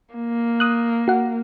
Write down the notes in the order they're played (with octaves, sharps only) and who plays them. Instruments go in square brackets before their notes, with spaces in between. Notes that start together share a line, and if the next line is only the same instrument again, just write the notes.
[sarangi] A#3
[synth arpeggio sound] D#6 F#6
F#4 F#5